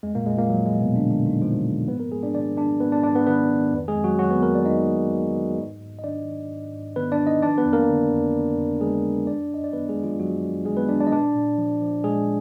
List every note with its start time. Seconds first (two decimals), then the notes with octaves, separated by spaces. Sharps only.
0.03 F2 G#3
0.15 A#2 A#3
0.26 F2 G#3
0.38 A#2 A#3
0.49 F3 F#3
0.65 G#3
0.72 F3
0.80 B2 B3
0.96 F2 D3 D4
1.11 D3 D4
1.19 F2
1.26 D#3 D#4
1.42 F3 F4
1.65 F3
1.88 G#2 B3 B4
2.00 A#3 A#4
2.11 G#2 G#3 G#4
2.23 D4 D5
2.34 D#3 D4 D5
2.57 D#3 D4 D5
2.80 G#2 B3 B4
2.92 D4 D5
3.03 G#2 D4 D5
3.15 B3 B4
3.27 D#3 B3 B4
3.50 D#3
3.73 F2
3.88 G#3 G#4
3.96 F2
4.04 F#3 F#4
4.19 D#3 F#3 F#4
4.31 B3 B4
4.42 D#3 A#3 A#4
4.55 D5
4.65 F2 D#4 D#5
4.88 F2
5.12 D#3
5.35 D#3
5.58 G#2
5.80 G#2
5.99 D#5
6.04 D#3 D4 D5
6.27 D#3
6.50 G#2
6.73 G#2
6.96 D#3 B3 B4
7.12 D4 D5
7.19 D#3
7.27 D#4 D#5
7.42 F3 D4 D5
7.58 B3 B4
7.66 F2
7.73 A#3 A#4
7.89 D3
8.12 F2
8.34 F3
8.58 F2
8.81 D3 G#3 G#4
9.04 F2
9.27 F#2 D4 D5
9.50 F#2 D#5
9.64 D5
9.73 D#3 B3 B4
9.89 G#3 G#4
9.96 D#3
10.04 F3 F4
10.19 F#2 F#3 F#4
10.42 F#2
10.65 D#3 G#3 G#4
10.77 B3 B4
10.89 D#3 D4 D5
11.00 D4 D5
11.07 D#5
11.12 A#2 D4 D5
11.36 A#2
11.58 F3
11.82 F3
12.04 A#2 G#3 G#4